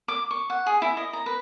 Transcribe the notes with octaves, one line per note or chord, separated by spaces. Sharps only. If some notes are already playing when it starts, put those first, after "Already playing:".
D6
C#6
F#5
G#4
E4
D#5
A#5
B4